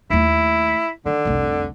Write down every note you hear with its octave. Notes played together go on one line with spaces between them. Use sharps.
D#2 A3 E4
D3 D#3
F1 C2